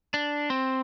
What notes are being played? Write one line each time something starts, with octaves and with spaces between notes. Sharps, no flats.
D4
C4